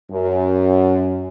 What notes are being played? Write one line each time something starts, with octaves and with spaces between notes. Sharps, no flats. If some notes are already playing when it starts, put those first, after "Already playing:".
F#2